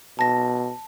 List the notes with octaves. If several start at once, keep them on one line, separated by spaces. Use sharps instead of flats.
B2 A5 A#6